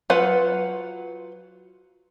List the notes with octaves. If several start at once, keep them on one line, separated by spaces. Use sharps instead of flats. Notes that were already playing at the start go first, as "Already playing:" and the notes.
F#3 F4 B4 F#5